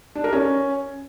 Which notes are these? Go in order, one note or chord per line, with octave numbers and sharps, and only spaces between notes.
D4
A#4
C#4